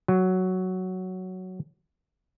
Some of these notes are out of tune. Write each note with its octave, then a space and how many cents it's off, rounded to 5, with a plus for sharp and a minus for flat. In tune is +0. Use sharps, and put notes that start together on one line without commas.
F#3 +5